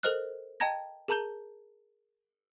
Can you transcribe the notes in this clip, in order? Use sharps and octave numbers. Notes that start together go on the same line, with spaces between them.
A4 A#4 C5 D#5 F6 F#6
D#5 G5 A5 A#5 G#6 A#6
G#4 A#4 A5 A#5 G6 G7